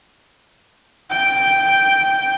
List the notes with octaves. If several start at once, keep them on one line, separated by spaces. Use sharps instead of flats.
G5